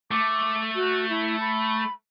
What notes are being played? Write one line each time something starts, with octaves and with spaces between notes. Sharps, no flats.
A3 D6
F#4
E4
B5